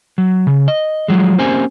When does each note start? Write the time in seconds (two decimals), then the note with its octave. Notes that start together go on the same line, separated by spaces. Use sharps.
0.18 F#3
0.47 C#3
0.68 D#5
1.08 F3 F#3 G#3
1.39 A#3 C4 C#4 G4 C5 G#5